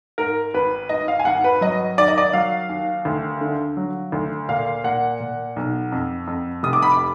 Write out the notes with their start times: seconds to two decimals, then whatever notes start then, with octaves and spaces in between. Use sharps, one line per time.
0.18 G#2 A#4
0.54 G#1 B4
0.89 G#2 D#5
1.08 F5
1.19 G#5
1.25 G#1 F#5
1.44 B4
1.61 F#3 D#5
1.98 D#3 D5
2.08 D#5
2.18 D5
2.33 F#3 F5
2.69 D#2
3.05 D2
3.41 D3
3.77 F#3
4.12 D2
4.49 A#2 F5
4.84 A#2 F#5
5.20 A#2
5.56 B1
5.92 F2
6.27 F2
6.63 F1 D#6
6.73 D6
6.82 B5
6.92 D6